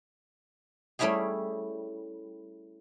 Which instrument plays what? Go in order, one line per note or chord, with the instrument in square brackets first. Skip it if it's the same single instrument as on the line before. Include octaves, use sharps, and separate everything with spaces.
[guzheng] G3 A3 C#4 E4 G4 G#4